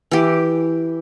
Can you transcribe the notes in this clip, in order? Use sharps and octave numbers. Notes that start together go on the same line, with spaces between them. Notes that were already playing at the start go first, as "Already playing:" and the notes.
E3 G4